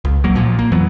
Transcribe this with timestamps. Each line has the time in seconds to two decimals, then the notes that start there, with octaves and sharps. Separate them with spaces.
0.05 C#2
0.24 B1 F#3 A#3
0.35 A#1 A#2 F3
0.59 A#3
0.72 F2 E3 F#3 B3